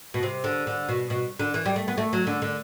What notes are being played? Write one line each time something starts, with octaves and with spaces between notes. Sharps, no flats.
B2
C3
D3
D3
B2
B2
D3
E3
G3
A3
B3
A3
F#3
D3
D3